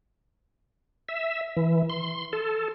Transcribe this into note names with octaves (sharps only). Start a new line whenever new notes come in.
E5
E3
C6
A4